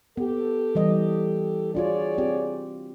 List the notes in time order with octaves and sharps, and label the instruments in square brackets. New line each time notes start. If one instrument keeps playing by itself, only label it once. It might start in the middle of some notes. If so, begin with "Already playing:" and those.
[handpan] B3 [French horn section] G4 A4
[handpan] E3 G3 D#5
[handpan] D4 F4 F#4 [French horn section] G#4 C#5 D5
[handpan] C4 F4 G4